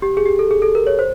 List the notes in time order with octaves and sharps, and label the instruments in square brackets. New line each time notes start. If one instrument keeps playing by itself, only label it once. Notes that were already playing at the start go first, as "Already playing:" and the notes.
[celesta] G4
G#4
G4
A4
G#4
A4
A#4
C#5
C5